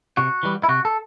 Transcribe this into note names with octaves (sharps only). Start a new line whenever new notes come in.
C3 F#4
E3 G3
E4
C3 F#4
A4